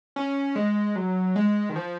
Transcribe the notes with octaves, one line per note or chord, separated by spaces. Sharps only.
C#4
G#3
F#3
G#3
D#3
F3